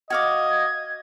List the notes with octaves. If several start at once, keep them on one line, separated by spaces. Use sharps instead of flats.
F#4 D#5 F5 D6 G#6